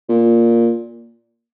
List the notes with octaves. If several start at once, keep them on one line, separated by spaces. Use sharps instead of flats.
A#2